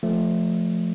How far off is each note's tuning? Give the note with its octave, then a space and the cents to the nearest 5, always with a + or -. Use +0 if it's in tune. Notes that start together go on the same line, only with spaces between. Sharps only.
F3 +0 A3 -5